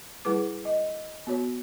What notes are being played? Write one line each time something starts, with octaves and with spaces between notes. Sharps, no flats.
G3 E4 G#4 B4 D6
D#5
B3 F#4 C#5